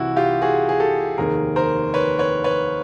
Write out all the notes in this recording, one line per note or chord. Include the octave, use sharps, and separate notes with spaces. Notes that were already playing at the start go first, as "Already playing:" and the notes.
Already playing: C2 C3 E3 E4 F#4
F4 G4
F#4 G#4
G#4
G4 A4
F1 D#2 D#3 G#4 A#4
A#4 C5
B4 C#5
B4 C#5
B4 C#5